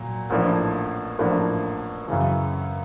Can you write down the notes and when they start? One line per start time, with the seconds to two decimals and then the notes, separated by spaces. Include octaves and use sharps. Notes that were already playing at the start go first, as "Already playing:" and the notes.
Already playing: A#2 F#3
0.30 A1 A2 F3 A#3 D4
1.19 A1 A2 F3 A#3 D4
2.08 F#2 C#3 E3